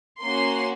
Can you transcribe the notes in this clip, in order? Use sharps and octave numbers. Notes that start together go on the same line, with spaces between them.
A#3 C#4 F#4 C6